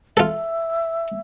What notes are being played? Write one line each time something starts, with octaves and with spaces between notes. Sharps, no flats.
F4 A4 E5